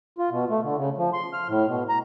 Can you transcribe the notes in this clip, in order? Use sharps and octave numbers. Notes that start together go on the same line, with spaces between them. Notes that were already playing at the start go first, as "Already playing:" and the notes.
F4
B2
A3
D3
C#3
F3
C6
F6
A2
B2
A#5